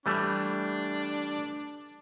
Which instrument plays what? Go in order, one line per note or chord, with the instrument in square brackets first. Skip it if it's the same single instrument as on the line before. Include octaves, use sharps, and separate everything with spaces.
[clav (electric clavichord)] E3 G3 A3 [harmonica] D4